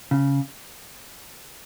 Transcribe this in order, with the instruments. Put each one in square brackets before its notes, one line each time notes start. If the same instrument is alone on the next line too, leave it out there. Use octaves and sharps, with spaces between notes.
[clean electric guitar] C#3